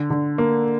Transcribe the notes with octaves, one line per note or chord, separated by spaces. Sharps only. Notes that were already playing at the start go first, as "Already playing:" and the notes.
Already playing: D3
D3
A#3